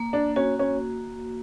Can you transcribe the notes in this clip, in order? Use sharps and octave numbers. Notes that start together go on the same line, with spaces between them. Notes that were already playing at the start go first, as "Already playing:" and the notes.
Already playing: A#3
D4
C#4 F#4
C#4